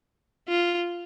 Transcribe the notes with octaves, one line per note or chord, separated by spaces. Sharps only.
F4